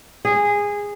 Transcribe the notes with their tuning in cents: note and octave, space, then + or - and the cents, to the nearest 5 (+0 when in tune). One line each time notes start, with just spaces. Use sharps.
G#4 -15